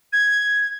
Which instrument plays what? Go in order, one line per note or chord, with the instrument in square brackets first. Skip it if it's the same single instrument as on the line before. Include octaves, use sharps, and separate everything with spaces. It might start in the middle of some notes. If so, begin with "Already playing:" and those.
[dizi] G#6